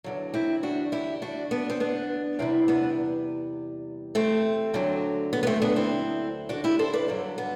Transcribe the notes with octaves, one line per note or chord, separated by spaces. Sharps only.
E2 D3 F#3
C4 E4
D4 F#4
E4 G4
D4 F#4
B3 D4
C4
B3 D4
E2 C3 G3 C4 E4
B3 D4
A3 C4
D2 D3 F#3
B3
B3
A3 C4
B3 D4
C4 E4
D4 F#4
E4 G4
A4 C5
B4 D5
G2 D3 F#3
B3